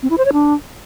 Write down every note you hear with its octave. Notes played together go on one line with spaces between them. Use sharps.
C4
E4
C5
C#5
D4